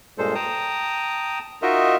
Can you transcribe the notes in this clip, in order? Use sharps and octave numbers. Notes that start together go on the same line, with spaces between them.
G2 A#2 G#3 A4 C5
G5 A5 A#5 D#6
D#4 F4 F#4 A#4 D#5 E5